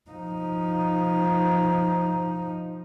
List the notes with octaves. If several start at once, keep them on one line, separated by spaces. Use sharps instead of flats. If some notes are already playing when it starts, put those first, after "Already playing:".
F3 D#4